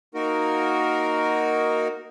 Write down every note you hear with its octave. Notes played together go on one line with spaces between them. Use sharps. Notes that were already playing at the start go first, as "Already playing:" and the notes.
A#3 D#4 F#4 A#4